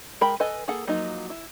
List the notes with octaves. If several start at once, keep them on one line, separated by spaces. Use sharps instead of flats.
G#3 A#4 G5 B5
A4 B4 D#5 G#5
A#3 G#4 A4 F#5
F3 F#3 A#3 D#4
E4